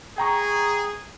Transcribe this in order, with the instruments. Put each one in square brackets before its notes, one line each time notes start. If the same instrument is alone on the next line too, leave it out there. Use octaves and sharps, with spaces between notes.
[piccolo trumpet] G#4 [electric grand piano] G5 A#5 C#6